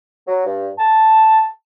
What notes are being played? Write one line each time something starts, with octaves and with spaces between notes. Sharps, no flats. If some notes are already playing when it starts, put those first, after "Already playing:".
F#3
G2
A5